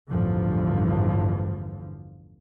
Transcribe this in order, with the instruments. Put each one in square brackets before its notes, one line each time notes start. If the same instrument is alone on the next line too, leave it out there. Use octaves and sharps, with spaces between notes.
[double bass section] A1 E2 G2 D3 F3